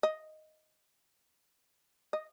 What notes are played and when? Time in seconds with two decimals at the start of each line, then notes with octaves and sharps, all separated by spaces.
0.03 D#5
2.13 D#5